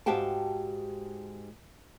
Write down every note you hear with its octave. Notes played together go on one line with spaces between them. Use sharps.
G#2 F#4 G4 F5 G5 A5